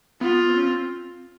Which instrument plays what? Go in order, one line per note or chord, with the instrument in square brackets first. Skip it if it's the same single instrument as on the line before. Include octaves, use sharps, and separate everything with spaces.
[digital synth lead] B3 [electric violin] F4
[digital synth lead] C4
C#4
C4